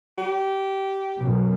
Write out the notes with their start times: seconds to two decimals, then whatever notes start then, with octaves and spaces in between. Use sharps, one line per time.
0.18 G4
1.17 F#2 B2